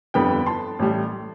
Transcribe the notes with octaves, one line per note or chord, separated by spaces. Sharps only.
G1 F2 D3 G3 B3 G5 B5
A5 C6
A1 A2 G3